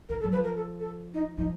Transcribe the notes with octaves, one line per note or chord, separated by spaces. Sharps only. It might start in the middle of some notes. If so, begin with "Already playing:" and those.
D#3 A#4
A4
F#3
F3 B4
A#4
A4
A4
D#4
F3 D#4